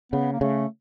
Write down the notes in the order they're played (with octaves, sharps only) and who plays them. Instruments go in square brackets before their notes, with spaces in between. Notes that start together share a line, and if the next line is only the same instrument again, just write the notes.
[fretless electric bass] C#3 [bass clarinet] B3
[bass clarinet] A#3
[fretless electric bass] C#3 [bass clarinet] A3